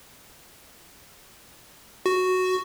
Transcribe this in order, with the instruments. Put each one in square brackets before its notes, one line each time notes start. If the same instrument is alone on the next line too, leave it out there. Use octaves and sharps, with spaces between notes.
[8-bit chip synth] F#4